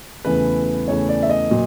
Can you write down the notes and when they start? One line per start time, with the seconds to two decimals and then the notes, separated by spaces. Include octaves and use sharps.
0.25 E2 C#3 E3 A3 B4
0.88 E2 C#3 E3 A3 C#5
1.09 D5
1.23 E5
1.30 D#5
1.51 A#2 F#3